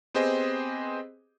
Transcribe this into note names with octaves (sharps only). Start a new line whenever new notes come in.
B3 C4 G4 G#4 C5 D#5